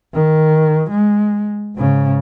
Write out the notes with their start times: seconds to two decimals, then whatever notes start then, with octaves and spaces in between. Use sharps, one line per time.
0.14 D#3
0.91 G#3
1.76 G#2 C#3